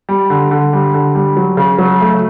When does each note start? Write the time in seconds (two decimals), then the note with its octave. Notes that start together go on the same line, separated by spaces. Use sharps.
0.09 G3
0.30 D3
0.51 D3
0.73 G3
0.94 D3
1.15 G3
1.37 F#3
1.57 C#3
1.78 F#3
2.01 A3